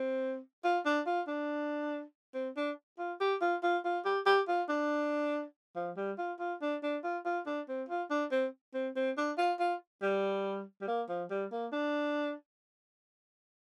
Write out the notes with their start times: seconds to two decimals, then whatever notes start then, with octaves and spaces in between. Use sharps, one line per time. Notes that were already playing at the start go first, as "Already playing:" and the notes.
Already playing: C4
0.64 F4
0.86 D4
1.06 F4
1.28 D4
2.34 C4
2.57 D4
2.99 F4
3.20 G4
3.41 F4
3.63 F4
3.85 F4
4.05 G4
4.26 G4
4.48 F4
4.69 D4
5.76 F3
5.97 G3
6.18 F4
6.39 F4
6.62 D4
6.83 D4
7.04 F4
7.25 F4
7.46 D4
7.68 C4
7.89 F4
8.11 D4
8.31 C4
8.74 C4
8.96 C4
9.17 D4
9.38 F4
9.59 F4
10.02 G3
10.81 G3
10.88 A#3
11.09 F3
11.30 G3
11.52 A#3
11.73 D4